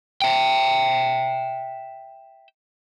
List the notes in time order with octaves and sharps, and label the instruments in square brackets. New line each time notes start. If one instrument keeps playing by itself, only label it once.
[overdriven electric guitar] E5 G5